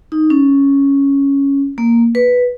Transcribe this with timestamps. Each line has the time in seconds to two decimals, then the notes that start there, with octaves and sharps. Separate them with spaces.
0.12 D#4
0.30 C#4
1.78 A#3
2.15 B4